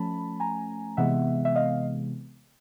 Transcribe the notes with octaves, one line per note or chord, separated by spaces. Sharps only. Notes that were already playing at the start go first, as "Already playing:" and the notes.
Already playing: F3 A3 C#4 A5 B5
G#5 A#5
C3 E3 G#3 B3 E5 F#5
E5
D#5 F5